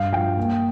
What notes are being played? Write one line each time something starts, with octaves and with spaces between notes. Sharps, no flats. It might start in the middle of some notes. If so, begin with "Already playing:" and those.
Already playing: G2 F5
F3 G5
A#3